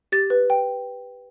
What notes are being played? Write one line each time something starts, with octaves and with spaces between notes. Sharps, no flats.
G4 A6
B4
G5